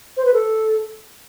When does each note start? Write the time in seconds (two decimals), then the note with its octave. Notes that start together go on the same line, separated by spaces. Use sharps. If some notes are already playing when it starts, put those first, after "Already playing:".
0.17 C5
0.25 B4
0.34 A4